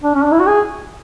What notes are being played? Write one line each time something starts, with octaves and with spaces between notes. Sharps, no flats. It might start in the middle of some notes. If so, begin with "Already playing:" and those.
D4
C#4
D4
E4
F#4
G#4